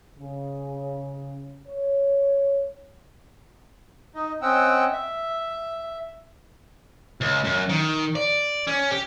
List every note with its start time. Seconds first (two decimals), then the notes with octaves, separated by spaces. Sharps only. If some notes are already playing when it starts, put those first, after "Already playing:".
0.19 C#3
1.68 C#5
4.15 D#4 D#5
4.42 C4 C#4 D#5 F#5 G5 E6
4.93 E5
7.21 C#2
7.44 F#2
7.69 D#3
8.16 D5
8.67 C#4
8.91 G4